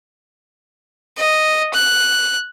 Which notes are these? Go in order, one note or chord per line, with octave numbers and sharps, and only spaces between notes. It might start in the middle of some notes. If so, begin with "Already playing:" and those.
D#5
F#6